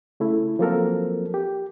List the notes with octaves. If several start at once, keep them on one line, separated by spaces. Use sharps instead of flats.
C#3 A3 E4
F3 F#3 A#3 C4 A4 A#4
G4